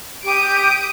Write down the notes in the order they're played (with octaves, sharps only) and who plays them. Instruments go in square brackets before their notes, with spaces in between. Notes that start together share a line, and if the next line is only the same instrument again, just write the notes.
[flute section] G4 [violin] D#6 D7